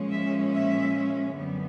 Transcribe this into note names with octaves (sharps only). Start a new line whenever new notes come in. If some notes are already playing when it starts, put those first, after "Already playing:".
Already playing: A#2 F3 G#3 C#4
E5
E5
F#2 D3 G3 B3